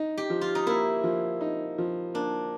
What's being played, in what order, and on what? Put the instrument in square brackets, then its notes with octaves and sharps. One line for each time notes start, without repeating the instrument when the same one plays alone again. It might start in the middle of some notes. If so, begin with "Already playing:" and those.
Already playing: [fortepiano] D#4
[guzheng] G4
[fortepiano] F3
[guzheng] F4
D#4
[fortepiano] A#3 [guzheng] E4
[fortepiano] F3
D#4
F3
[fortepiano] A#3 [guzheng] D4